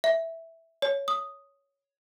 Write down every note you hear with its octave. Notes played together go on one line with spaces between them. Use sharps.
E5
C#5
D#6